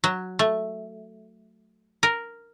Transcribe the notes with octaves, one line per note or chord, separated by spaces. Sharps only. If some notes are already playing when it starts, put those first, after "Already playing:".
F#3
A3
A#4